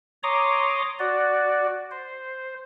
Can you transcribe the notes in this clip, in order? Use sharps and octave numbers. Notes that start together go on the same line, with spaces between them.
C#5 A#5 C6 D6 D#6
F#4 D5
C5